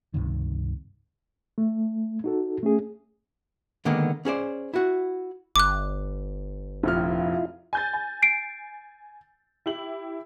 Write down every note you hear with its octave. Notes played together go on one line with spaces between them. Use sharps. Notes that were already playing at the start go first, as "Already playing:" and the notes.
C#2 G2 C3 D#3
A3
D#4 F#4 A4
A3 C#4 G#4
D3 D#3 G#3 A#3 B3
C#4 G#4 C5 D5
E4 F#4
G1 D6 F#6
F1 A#1 E4 F4 F6
G#5 G6 A6
G#5
C7 D7
E4 G4 F#7